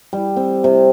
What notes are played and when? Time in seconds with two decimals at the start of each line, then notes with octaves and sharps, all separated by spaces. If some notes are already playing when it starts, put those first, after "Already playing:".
0.13 G3
0.37 C4
0.64 C3